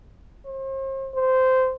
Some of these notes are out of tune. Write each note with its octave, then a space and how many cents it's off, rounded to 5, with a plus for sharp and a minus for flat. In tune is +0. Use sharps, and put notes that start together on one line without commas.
C5 +40
C5 -15